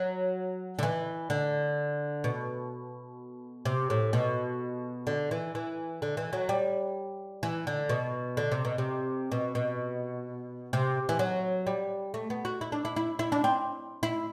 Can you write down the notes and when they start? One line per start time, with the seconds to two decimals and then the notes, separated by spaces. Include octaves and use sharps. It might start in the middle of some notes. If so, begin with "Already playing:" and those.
Already playing: F#3
0.79 D3
0.83 E3
1.30 D3
2.24 B2
3.65 C3
3.90 A2
4.13 B2
5.07 D3
5.31 E3
5.55 E3
6.02 D3
6.17 E3
6.33 F#3
6.49 G3
7.43 E3
7.67 D3
7.89 B2
8.37 D3
8.52 C3
8.65 B2
8.78 C3
9.32 B2
9.55 B2
10.73 C3
11.09 E3
11.19 F#3
11.67 G3
12.14 A3
12.30 B3
12.45 F#4
12.61 E4
12.72 D4
12.85 E4
12.96 E4
13.19 E4
13.32 D4
13.44 C4
14.03 E4